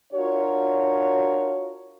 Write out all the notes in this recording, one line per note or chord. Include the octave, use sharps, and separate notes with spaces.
D4 F4 F#4 A#4 C#5